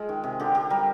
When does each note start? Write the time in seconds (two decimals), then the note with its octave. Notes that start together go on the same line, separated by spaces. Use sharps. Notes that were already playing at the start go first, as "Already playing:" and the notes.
Already playing: G#3 F4
0.09 D#3
0.24 C3
0.40 D3 G4
0.55 D3 G4
0.70 G3 A#4